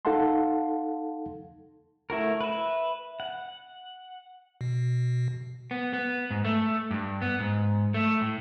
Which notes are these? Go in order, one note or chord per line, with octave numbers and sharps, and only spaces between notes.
D#4 A4 F5 F#5 A5 C6
A3 E4 F#4 A#4
B4 E5
F#5
B2
B3
B3
G#2
A3
G2
B3
G#2
A3
A2